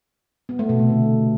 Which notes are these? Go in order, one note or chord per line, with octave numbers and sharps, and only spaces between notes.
B3
A3
B2
C3
D3